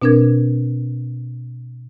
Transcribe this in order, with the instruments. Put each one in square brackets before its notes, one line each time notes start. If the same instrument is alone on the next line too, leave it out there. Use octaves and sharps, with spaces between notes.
[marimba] B2 C4 D4 A#4 G#6